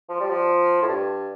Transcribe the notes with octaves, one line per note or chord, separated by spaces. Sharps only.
F3
G3
F3
A2
G2